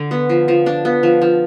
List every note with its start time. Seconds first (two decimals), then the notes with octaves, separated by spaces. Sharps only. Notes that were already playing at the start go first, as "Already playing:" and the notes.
Already playing: D3
0.11 B3
0.29 F3
0.48 F3
0.66 D4
0.85 B3
1.03 F3
1.22 F3